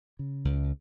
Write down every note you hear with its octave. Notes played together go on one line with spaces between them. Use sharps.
C#3
C#2